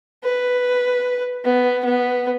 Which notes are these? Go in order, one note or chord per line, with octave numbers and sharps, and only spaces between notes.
B4
B3
B3